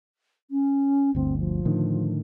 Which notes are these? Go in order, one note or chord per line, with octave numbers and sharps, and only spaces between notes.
C#4
G1 D2 C4
F3
A2 D3 D#3